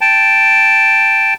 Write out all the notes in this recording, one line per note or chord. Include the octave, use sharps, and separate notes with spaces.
G5 A5